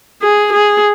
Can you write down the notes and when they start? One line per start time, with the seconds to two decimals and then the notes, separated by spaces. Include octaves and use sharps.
0.22 G#4
0.53 G#4